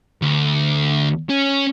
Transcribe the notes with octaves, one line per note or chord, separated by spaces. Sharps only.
D2
C#4